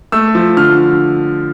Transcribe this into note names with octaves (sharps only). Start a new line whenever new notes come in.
A3 E6
F3
D3 F6